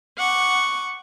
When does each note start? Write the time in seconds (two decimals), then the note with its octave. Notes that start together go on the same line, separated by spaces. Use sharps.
0.18 F#5 C#6 D6